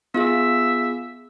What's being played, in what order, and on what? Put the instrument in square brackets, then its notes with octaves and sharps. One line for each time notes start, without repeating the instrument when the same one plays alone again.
[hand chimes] B3 F4 G#4 [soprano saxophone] E5